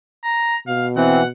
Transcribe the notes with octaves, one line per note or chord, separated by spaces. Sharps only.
A#5
B2 F5
E3 C4 F#5